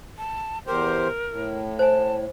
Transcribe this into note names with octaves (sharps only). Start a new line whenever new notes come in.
A5
E2 G4 A#4 C5
A2
C5 G#5 A5